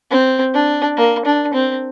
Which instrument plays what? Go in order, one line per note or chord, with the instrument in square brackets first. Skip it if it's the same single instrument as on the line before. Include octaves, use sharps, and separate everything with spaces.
[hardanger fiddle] C4
D4
A#3
D4
C4